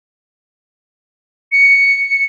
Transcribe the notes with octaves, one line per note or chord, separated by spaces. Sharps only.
C#7